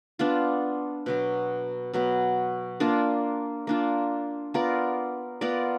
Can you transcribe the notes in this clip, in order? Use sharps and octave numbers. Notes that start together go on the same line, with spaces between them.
B3 D4 F4
B2 F#3 B3
B2 F#3 B3
A#3 D4 F4
A#3 D4 F4
B3 F4 A#4 D5
B3 F4 A#4 D5